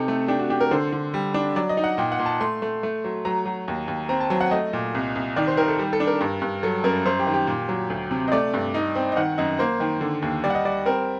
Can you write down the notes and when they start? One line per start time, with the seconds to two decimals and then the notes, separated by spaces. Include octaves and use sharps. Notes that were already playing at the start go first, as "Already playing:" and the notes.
Already playing: C3 D#4 A4
0.08 A3
0.28 D4 G4
0.39 F#4
0.50 D4 G4
0.60 A#4
0.71 D3 C5
0.92 D3
1.14 G3
1.34 D4
1.56 F#3 D5
1.69 D#5
1.77 D#4
1.84 F#5
1.98 A#2 G5
2.12 F#5
2.19 A#2
2.26 A5
2.40 A3 C6
2.62 A3
2.83 A3
3.04 F#3
3.25 F#3 A#5
3.45 F#3
3.68 D#2
3.88 D#2
4.09 C4 A#5
4.20 A5
4.30 F#3 G5
4.41 F#5
4.51 A3 D#5
4.73 A#2
4.95 C2
5.16 C2
5.36 D#3 D5
5.47 C5
5.57 D#3 A#4
5.68 A4
5.78 G3 G4
5.93 A4
6.00 D4
6.07 A#4
6.21 G2
6.42 G2
6.63 F#3 A4
6.84 F#2 A#4
7.05 F#2 C5
7.19 G4
7.27 D#3
7.34 G4
7.47 A#2
7.69 F#3
7.90 D2
8.11 C3
8.28 D#5
8.32 A3 D5
8.54 G2
8.74 D#4
8.95 C4
9.12 D#5
9.17 D#3 F#5
9.38 F#2 D#5
9.59 A#3 C5
9.80 D#3
10.01 D3
10.22 D#2
10.44 G3 D5
10.50 F#5
10.55 D#5
10.65 G3 D5
10.86 C4 A#4